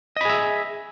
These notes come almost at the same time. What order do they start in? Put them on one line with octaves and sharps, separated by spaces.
D#5 B5 G#4 E5